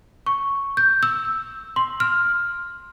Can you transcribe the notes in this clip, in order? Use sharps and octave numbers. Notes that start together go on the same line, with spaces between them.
C#6
G6
E6
C6
F6